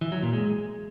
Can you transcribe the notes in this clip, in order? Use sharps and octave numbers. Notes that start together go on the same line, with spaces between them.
E3
F#3
A#2
G#3